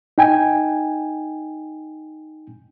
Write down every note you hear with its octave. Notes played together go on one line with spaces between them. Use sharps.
D#4 G5 G#5